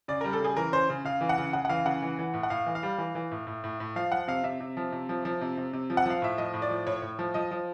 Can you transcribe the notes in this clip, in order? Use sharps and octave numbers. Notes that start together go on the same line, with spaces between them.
C#3 D5
G3 A#4
A4
C#3 G#4
E3 A#4
C#3 C5
C#3
C#3 F5
E3
F#5
C#3
C#3 F#5
F#5
E3 F5
C#3 F#5
E3
E3
A2
F#5
A2 F5
E3
F5
G3
E3
E3
A2
A2
A2
A2
F3 F5
F3 F#5
C3 F5
C3 E5
C3
F3
C3
F3
F3
C3
C3
C3
F3
F#5
F3 F5
A2 E5
F3 D#5
A2
D5
F3
A2 C#5
A2
F3
F3 D#5
F3